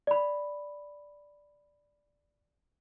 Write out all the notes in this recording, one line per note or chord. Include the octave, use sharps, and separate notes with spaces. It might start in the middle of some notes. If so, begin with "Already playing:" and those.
D5 B5